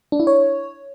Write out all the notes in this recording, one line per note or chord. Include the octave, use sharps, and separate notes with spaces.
D4
E4
C#5